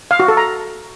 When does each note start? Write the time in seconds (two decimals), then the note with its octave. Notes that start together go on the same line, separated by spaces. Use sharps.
0.11 F5
0.20 F#4
0.28 A4
0.37 A#5